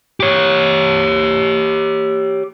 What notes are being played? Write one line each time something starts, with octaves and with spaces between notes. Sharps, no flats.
G4 C#5